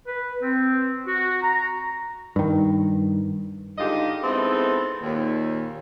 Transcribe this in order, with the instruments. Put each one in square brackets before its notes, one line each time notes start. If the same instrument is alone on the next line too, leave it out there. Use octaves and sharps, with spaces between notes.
[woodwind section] B4
C4
F#4
A#5
[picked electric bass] G2 D#3
[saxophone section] G#2 D3 D#4 F4 G4 D#5
G#3 B3 C4 D#4 E4 A4
D#2 A#2